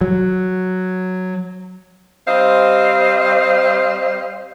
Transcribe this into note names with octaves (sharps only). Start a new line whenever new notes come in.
F#3
G3 C4 C5 D#5 F5